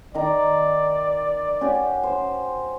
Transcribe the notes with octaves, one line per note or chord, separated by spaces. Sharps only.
D#3 D5 A#5
C#4 F#4 G4
C5